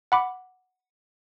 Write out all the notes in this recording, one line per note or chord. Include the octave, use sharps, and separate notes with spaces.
F#5 B5 D6